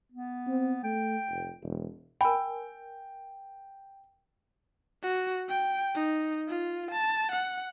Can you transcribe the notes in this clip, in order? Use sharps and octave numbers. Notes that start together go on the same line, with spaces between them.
B3
C4
A3 G5
F1
E1
A#4 G5 G#5 B5
F#4
G5
D#4
F4
A5
F#5